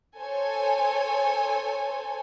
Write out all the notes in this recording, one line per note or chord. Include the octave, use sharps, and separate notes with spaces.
A4 C5 C#5 G#5